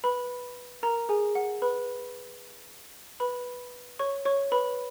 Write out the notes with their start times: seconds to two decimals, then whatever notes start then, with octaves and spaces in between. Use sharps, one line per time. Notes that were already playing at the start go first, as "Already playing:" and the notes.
0.04 B4 B5
0.83 A#4 A#5
1.09 G#4 G#5
1.35 F#5
1.62 B4 B5
3.20 B4 B5
3.99 C#5 C#6
4.25 C#5 C#6
4.52 B4 B5